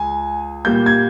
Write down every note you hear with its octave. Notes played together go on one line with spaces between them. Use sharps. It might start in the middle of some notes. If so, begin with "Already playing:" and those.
Already playing: C#2 G#5
A#2 G3 A#3 G6
G#6